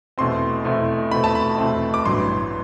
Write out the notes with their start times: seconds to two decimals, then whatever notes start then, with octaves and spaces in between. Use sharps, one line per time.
0.18 E2 B2 A3 C4 C6
0.64 E2 B2 A3 C4
1.11 E2 B2 A3 C4 B5
1.24 A5
1.35 B5
1.58 E2 B2 A3 C4
1.94 D6
2.05 A1 G2 F#3 B3 C6